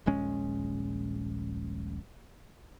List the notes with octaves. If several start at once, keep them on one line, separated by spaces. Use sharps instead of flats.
D#1 A#1 G#3 C#4